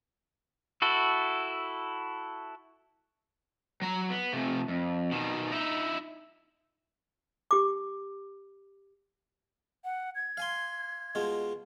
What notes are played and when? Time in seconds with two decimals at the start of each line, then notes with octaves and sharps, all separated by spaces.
0.82 E4 F#4 A4
3.82 F#3 A#5
4.10 B3
4.33 C3 A3
4.68 F2
5.12 B2 D#3
5.51 D#4 E4
7.51 G4 D6
9.85 F#5
10.16 G#6
10.37 F5 G#5 C6
11.15 B2 G#3 F4